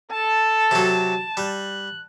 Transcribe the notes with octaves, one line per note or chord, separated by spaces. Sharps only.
A4 A5
C3 F#3
G3 F#6